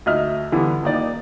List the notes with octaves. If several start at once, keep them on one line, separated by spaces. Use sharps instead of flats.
D2 D#4 D#5 E5 F6
D3 E3 G3 B3
D#1 D#2 D#4 D5